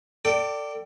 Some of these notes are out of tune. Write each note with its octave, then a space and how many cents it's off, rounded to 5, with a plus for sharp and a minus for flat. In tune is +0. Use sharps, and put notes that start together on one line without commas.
A4 +30 D5 +0 G5 -20